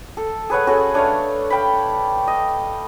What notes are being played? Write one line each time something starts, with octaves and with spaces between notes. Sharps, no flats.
A4
G#4 B4 C#5 F#5
C#4 F#4 G#4 A4
A3 D4 C#5 F5
F5 G5 A5 B5
D#5